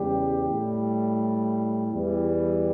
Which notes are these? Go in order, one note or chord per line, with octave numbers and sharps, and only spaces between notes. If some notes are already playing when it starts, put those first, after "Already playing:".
Already playing: E2 C#3 G3 G4
A2 G3
E2 E3 G3